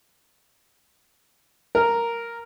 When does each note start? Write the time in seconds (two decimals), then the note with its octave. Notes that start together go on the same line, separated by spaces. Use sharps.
1.75 A#4